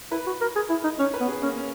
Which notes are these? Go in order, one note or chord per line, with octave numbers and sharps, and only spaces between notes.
E4 B4
F#4
A#4
G#4
E4
D#4
C#4 C#5
B4
B3
G#4
A#3 C#4
C#4